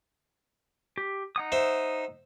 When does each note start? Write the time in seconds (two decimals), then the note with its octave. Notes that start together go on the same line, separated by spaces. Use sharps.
0.98 G4
1.36 D#4 F#5 D#6
1.52 C5 E5